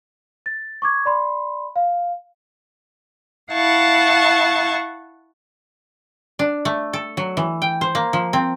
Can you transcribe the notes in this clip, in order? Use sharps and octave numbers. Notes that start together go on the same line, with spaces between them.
A6
C#6 D6 G#6
D5 B5 C6
F5
E4 F5 F#5 A5 C#6
D4
A3
A4
F#3
E3
G5
C5
A#3
F3
C4